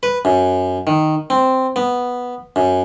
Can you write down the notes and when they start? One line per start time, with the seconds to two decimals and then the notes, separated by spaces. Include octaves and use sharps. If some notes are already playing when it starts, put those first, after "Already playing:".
0.03 B4
0.25 F#2
0.87 D#3
1.30 C4
1.76 B3
2.56 F#2